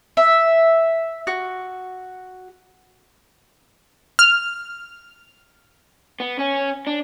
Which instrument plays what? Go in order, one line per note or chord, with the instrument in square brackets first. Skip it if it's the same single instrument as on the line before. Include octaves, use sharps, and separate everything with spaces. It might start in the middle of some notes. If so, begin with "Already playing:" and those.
[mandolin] E5
F#4
[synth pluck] F6
[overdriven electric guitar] B3
C#4
D4